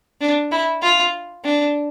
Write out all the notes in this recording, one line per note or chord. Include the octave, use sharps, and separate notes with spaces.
D4
E4
F4
D4